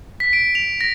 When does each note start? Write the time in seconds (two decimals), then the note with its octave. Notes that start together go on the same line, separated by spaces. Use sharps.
0.20 B6
0.33 D7
0.55 F7
0.81 A#6